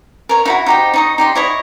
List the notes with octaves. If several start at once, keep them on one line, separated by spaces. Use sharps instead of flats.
A#4 C#5
D#4 E4 F#4
D#4 G4 C5
D#4 C#6 D#6
D#4 G4 C6
E4 C#5 D#5